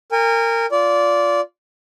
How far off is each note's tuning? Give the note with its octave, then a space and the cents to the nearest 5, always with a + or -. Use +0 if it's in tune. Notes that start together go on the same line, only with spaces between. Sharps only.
A#4 -20 G#5 -45
F4 +0 D5 -20